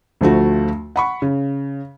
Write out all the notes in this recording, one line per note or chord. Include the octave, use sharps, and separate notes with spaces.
D2 F3 A3 F#4
F#5 B5 C#6
C#3